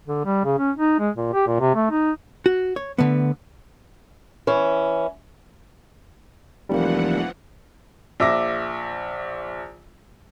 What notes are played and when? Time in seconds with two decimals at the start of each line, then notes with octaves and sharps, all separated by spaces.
0.07 D3
0.25 G3
0.44 C#3
0.58 C#4
0.76 D#4
0.99 G#3
1.16 A#2
1.33 G4
1.47 A#2
1.60 C3
1.75 A3
1.91 D#4
2.46 F#4
2.76 C#5
2.98 D3 A3 B3
4.47 E3 C#4
6.69 F1 E3 F3 G3 A#3 F#5
8.20 A#1 E5 D6 A#6